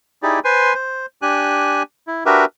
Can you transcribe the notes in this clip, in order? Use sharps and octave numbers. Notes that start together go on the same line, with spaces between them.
D#4 E4 G4 G#4 D5
B4 C5 G#5 C6
C5
D4 G4 G#5 F#6
E4
D4 F#4 G4 A#4 B4 E5